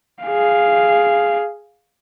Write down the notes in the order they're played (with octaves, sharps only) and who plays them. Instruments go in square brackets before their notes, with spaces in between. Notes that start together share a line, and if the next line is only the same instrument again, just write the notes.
[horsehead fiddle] G#4 F5